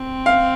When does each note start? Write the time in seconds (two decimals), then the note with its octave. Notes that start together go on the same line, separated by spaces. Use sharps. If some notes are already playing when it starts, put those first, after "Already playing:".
Already playing: C4
0.26 F5